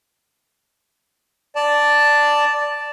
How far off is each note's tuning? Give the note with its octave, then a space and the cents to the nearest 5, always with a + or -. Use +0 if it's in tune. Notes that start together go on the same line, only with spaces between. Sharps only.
D5 +0 A5 +0